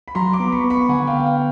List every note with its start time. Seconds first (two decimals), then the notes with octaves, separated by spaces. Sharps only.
0.08 B5
0.15 F#3 A#5 C6
0.33 C6 D6
0.40 B3
0.52 B5 C#6
0.64 B3
0.70 B5 C#6
0.89 D3 F#5 G#5
1.07 F5 G5
1.13 B3
1.25 F5 G5